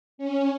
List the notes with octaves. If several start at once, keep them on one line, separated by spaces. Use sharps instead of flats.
C#4